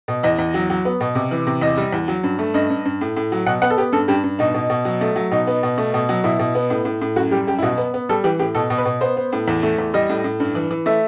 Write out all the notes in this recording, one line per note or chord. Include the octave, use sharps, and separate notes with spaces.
B2
E2 D#5
E2
F#3
F#3
B3
B2
C3
E3
C3
E2 D#5
G3
E2
F#3
G2
A3
G2 D#5
G2
G2
A2
A2
F#3
B2 F#5
B3 F#5
A4
B3 G4
G2 A4
G2 G4
G2
B2 D#4
B2
B2
F#3
A3
F#3
B2 D#4
B3
B2
A3
B2
F#3
B2 E4
B2
B3
A2
A2
A2
F#2 F#4
G3 G4
F#2 G4
E4
B2 F#4
B3
B3
G3 A4
E3 G4
A2 G4
B2 A4
B2
B4
B2
B3 C5
B3
A2
E2
A3
E2
G3 D#5
A2
A2
G2
E3
E3
A3 E5